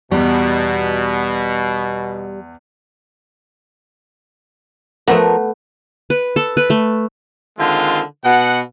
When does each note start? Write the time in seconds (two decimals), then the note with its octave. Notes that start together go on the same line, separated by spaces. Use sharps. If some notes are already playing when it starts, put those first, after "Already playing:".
0.12 E2 B2 G3
5.08 F3 A3 B3 A#4
6.10 B4
6.36 A4
6.57 B4
6.70 A3
7.59 D3 D#3 G#3 C4 F4
8.24 B2 F#5